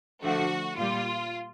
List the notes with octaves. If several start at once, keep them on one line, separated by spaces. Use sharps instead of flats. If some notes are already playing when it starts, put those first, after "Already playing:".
D3 F3 A3 F#4
A#2 G3 F4